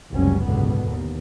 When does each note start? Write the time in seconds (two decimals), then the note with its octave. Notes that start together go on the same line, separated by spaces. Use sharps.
0.12 F#1 C#2 C3 F#3 G3 C#4
0.43 C#2 G#2 B2 D3 B3
0.85 D#2